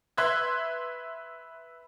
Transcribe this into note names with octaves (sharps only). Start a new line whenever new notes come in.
B4 E5 C6 E6 F#6 G#6